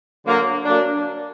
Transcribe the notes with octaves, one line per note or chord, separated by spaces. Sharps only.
D3 F#3 A#3
F#3 A#3 D4